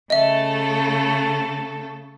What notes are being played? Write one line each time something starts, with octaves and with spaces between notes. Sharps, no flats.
C#3 A3 A4 D#5 E5